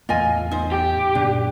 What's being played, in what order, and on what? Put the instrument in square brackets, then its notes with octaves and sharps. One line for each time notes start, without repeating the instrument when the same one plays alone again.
[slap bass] E2 A2 A3 [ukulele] F4 D#5 G#5
[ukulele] D#4 C5
[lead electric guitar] G4
[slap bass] F#2 A#2 D3 [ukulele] D4